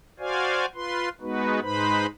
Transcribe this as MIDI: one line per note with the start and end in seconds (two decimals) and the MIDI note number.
0.19 0.66 66
0.19 0.66 72
0.19 0.66 74
0.19 0.66 77
0.19 0.66 80
0.75 1.09 65
0.75 1.09 71
0.75 1.09 84
1.21 1.60 56
1.21 1.60 59
1.21 1.60 63
1.21 1.60 66
1.21 1.60 71
1.62 2.06 44
1.62 2.06 56
1.62 2.06 63
1.62 2.06 71
1.62 2.06 72
1.62 2.06 83